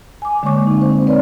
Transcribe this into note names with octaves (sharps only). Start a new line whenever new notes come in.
G#5 D6
D3 G#3 A#3 C#5 C#6 D6
C4 D#4
C5
C4 B4 C#5 D5